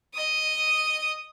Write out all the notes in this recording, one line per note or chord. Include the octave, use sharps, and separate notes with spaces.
D#5 D#6